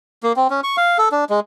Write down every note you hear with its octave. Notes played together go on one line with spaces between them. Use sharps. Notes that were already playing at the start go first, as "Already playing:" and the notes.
A#3
C4
C#4
C#6
F5
A4
D4
G#3